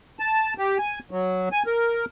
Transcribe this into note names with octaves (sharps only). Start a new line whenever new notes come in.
A5
G4
G#5
F#3
G#5
A#4